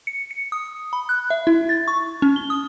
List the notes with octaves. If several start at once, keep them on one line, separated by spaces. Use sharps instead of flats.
C#7
C#7
D#6
B5
F#6
E5
E4
A6
C#6
C#4
G7
D#6